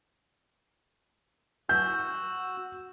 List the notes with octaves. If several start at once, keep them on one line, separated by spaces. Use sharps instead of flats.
F#4 E6 G6